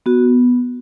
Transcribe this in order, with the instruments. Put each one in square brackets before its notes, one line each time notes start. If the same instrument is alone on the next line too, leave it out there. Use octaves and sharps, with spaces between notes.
[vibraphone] B3 F#4